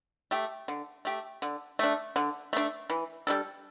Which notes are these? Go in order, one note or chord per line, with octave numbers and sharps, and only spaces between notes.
A3 G4
D3
A3 G4
D3
A3 D4
D3
A3 D4
E3
G3 D4 A4